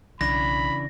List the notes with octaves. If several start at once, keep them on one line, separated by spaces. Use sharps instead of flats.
B1 C#3 E3 D4 B5 A#6